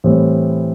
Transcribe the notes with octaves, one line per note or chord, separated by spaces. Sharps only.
A2 E3 G3 C4